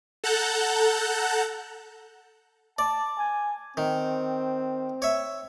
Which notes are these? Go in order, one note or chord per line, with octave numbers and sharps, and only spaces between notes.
A4 F#5 A5 A#5 F#6 G6
D5 A5
G#5
D#3 C4
C#5 E5